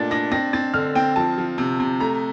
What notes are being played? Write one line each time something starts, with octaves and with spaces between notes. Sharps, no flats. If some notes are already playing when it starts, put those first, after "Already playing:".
Already playing: A#2 A3 D4 A6
D4 A#6
C4 A#6
C4 A6
D3 F6
C4 G5
F3 A5
F3
C3
C3
A3 A#5